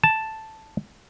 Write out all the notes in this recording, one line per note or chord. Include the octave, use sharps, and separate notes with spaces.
A5